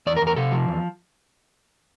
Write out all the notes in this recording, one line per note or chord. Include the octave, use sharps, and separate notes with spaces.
E2 D5
A#4
E2
A#4
C3 A4
F3
E2